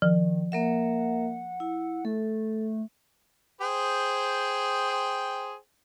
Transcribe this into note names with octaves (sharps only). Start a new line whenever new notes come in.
D#3 F3
A#3 A#4 E5 F#5
E4
A3 A4
G#4 C5 G5